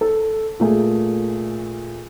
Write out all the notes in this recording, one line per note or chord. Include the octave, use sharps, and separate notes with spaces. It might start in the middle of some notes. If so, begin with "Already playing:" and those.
A4
A#2 A3 G#4